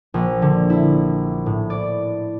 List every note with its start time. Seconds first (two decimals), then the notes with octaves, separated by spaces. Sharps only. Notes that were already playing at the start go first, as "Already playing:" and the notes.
0.14 A#1
0.42 D3
0.70 E4
1.46 A2
1.70 D5